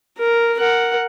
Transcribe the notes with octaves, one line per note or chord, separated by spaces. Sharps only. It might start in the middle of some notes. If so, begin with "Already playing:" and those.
A#4
A#4 F#5